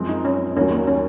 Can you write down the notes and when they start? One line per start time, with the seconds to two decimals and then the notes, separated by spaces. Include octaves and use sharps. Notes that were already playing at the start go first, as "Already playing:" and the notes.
Already playing: F#2 F3 G#3 C4
0.09 D#4
0.25 C#4
0.56 D#2 D#3 F#3 C#4
0.72 A#3
0.87 C#4